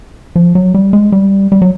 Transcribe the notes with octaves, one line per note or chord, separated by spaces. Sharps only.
F3
F#3
G3
G#3
G3
G3
F#3